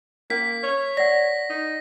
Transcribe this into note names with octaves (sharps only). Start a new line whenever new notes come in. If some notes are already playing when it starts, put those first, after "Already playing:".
A#3 C#4 B6
C#5
D5 F#5 A#6
D#4